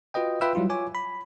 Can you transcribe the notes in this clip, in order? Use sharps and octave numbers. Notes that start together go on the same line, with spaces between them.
F4 F#4 B4 D#5 G5
F4 B4 E5 G5 B5 E6
F#3 G3 E4 F4
F4 C#5 G#5 D6
B5